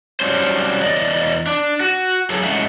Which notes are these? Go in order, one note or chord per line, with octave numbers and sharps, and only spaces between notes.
F#3 G3 C#4 C5
E2 D5 D#5
D4
F#4
F#3 G#4 A4
G#2 G#3 C#4 E5 F#5